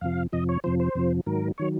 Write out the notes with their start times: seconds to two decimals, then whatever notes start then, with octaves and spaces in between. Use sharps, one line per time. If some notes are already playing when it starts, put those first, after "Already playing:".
0.01 F2 C3 F3 F5
0.33 F2 C3 F3 D#5
0.49 C#5
0.64 F2 C3 F3 C5
0.80 C5
0.95 F2 C3 F3
1.26 G#2 D#3 F#3 A#4
1.58 D#3 F#3 C#5